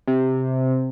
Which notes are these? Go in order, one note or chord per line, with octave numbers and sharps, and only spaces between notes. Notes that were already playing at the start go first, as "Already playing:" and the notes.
C3